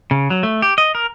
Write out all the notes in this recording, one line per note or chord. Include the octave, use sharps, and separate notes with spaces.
C#3
F#3
A3
G4
D#5
A#4